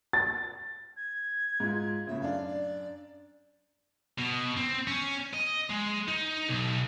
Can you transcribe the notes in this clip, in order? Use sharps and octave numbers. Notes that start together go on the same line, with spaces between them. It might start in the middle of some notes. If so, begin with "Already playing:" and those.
A6
G#6
G#2 F4
A2 C#3 E5
F#2 D4 F5
D5
B2
C4
C#4
D#5
G#3
D#4
B1